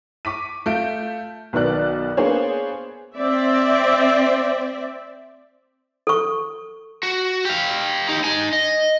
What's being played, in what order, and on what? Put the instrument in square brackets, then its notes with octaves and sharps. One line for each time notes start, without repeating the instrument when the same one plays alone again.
[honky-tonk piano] C#6 D6 B6 D#7
A3 F4 G6 D7
B1 D#3 B3 D5 F#6
A#3 B3 D4 G#4 C5 C#5
[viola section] C4 D5 E5
[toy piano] A4 C#6
[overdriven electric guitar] F#4
G4 F5
D#4 G4
D#4 G#5
D#5